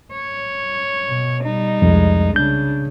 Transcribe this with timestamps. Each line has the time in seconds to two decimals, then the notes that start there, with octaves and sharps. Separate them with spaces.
0.12 C#5
1.09 B2
1.44 G3 D#4
1.82 C2 F2 G#3
2.36 C#3 D4 G6